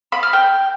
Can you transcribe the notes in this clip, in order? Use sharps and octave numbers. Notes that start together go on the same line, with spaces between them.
B5
F6
G5